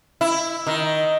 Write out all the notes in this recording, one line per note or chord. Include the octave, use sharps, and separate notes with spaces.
E4
D#3